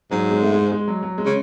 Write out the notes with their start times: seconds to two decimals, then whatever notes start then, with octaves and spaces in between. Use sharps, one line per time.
0.11 G#2 F#3
0.31 G#3
0.42 A3
0.52 G#3
0.72 G#3
0.88 F#3
1.03 F#3
1.18 G#3
1.25 C#3